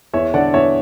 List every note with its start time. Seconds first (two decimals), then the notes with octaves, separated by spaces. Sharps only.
0.14 E2 C#5 E5
0.34 D3 D5 F#5
0.54 E2 C#5 E5